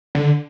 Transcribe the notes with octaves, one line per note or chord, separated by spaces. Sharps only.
D3